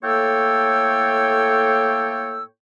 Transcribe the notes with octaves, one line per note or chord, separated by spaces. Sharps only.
A2 A#3 A4 C#5 G5 E6